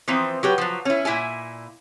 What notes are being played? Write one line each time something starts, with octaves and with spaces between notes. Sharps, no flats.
E3 F3 C4 A#5
F#3 G4 B4
F3 F#3
C#4 E4
A#2 E4 E5 G#5